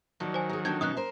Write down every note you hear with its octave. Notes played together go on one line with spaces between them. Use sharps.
D#3 F3 F#3 D5
C5 G#5
G#4 A#4
D3 F3 C4 G6 G#6
F#2 B2 D#4 D#6 F#6
A#4 C5